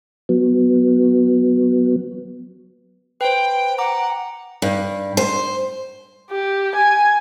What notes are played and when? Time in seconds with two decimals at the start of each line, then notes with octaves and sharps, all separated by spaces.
0.29 F#3 B3
3.21 B4 C5 G5
3.78 F#5 A#5 D6
4.62 G2
5.17 C5
6.31 G4
6.75 G#5